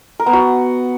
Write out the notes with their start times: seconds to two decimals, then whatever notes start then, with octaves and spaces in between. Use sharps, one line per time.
0.20 A#4
0.26 B3
0.33 F#4